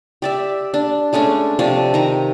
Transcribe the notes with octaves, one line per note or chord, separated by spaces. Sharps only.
G4 D5 E5
D4
G#3 A3 C#4 D4
C3 F3 D4
D#3 A#5